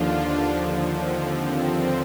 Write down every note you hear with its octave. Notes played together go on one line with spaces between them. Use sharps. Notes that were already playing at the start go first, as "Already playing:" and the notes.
Already playing: D#2 D3 F3 D4 F4
D#2 D3 F3
C4